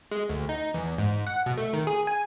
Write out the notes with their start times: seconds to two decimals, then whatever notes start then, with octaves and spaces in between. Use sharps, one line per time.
0.12 G#3
0.29 D2
0.49 D#4
0.74 E2
0.98 G#2
1.27 F#5
1.46 B2
1.58 A3
1.73 D#3
1.87 G#4
2.07 G#5